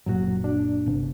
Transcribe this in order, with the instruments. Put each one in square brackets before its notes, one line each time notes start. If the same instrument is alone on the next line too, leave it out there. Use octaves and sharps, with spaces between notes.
[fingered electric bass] F#1 A#2 [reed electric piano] F#3 F#4
[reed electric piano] D4
[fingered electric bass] G1 C3 B3